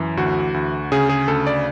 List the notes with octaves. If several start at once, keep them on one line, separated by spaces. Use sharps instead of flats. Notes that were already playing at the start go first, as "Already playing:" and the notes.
Already playing: F#2 E3
D2 F#4
D2
C#3 G#4
G#4
D2 A4
D5